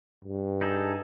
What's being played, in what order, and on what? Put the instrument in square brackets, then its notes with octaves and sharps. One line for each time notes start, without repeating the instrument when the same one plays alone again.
[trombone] G2
[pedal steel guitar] D#4 G#4 A4